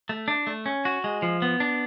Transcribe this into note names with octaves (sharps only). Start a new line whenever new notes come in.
A3
D4
A3
C#4
F#4
G#3
F3
B3
D4